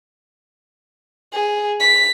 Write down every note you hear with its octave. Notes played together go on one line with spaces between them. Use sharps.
G#4
B6